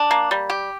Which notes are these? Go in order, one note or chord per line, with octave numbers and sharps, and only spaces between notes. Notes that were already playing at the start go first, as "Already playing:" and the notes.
Already playing: D4
A#3
G3
G4